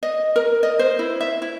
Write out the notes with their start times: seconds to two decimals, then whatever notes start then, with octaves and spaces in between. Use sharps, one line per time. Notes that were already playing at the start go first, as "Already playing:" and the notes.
0.03 D#5
0.36 A#4
0.63 D#5
0.79 C5
0.99 E4
1.21 E5
1.42 E4